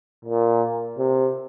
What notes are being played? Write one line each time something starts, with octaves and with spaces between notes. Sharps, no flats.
A#2
C3